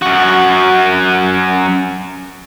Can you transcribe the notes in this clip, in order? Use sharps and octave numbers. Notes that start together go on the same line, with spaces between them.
F#2 F#4